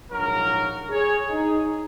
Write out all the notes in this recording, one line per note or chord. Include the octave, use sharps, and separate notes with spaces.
A#1 G#2 F#3 A#3 F#4 A#4
G#4 C#5
D#4 G#4